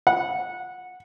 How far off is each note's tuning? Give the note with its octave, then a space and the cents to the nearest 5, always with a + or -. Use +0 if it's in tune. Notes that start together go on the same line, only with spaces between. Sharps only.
F#5 -15